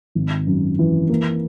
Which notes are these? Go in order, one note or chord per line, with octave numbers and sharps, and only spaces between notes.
G#1
F#2
E3
A#3